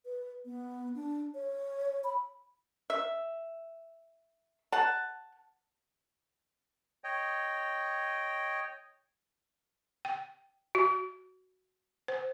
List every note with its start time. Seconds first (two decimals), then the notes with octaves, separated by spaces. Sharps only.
0.05 B4
0.45 B3
0.95 D4
1.35 C#5
2.04 B5
2.90 E5
4.72 F#5 A5
7.04 C#5 D#5 G5
10.05 G5
10.75 F#4
12.08 C5